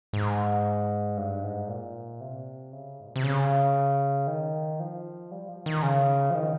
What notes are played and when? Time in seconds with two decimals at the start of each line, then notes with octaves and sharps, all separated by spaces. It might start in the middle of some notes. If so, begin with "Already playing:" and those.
0.13 G#2
1.17 G2
1.43 G#2
1.68 A#2
2.21 C3
2.72 C#3
3.00 G#2
3.08 A#2
3.16 C3
3.24 C#3
4.27 D#3
4.80 F3
5.31 G3
5.49 F3
5.66 D#3
5.83 C#3
6.30 F3
6.35 D#3